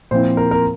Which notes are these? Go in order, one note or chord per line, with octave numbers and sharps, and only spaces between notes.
A#2 F3 C4 E4 C5
A#4
A#4